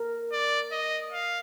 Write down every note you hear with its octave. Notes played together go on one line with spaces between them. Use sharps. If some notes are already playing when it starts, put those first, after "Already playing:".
Already playing: A#4
D5
D#5
F5